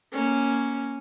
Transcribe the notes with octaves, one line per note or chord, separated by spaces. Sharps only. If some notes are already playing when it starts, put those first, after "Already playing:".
A#3 C#4